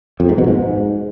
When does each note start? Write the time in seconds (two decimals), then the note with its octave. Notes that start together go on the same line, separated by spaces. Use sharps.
0.20 F2
0.29 G#2
0.38 B2
0.47 G#2